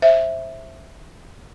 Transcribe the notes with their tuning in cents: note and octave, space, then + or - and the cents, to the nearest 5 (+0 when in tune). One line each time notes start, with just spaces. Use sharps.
C5 +25 E5 +0